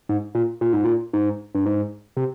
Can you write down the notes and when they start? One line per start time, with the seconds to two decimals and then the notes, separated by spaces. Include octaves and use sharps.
0.09 G#2
0.35 A#2
0.61 A#2
0.73 G#2
0.85 A#2
1.13 G#2
1.55 G2
1.66 G#2
2.17 C3